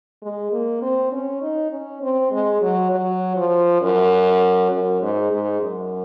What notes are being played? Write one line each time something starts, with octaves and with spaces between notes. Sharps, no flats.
G#3
A#3
C4
C#4
D#4
C#4
C4
G#3
F#3
F#3
F3
F#2
F#2
G#2
G#2
F#2